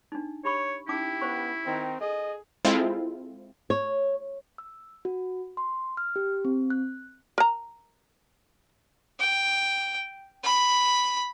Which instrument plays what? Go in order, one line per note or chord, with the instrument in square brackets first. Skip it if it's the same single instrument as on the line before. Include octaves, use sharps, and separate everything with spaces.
[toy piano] D4 D#4
[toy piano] G4 B5 C#6 [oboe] C#5
[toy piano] C#4 D#4 D6 [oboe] E4 [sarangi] G4
[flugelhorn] B3 [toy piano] C5 C#6
[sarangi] D#3 [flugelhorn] C4
[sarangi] G#4 [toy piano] A4 [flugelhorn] D#5
[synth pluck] G#3 C4 E4 F4 A4
[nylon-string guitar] C#5
[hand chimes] E6
F#4
C6
F6
G4
C4
F#6
[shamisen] A#4 A#5
[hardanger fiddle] G5
B5